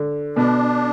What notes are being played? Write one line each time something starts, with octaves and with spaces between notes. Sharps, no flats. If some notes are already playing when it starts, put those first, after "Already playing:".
Already playing: D3
B2 D4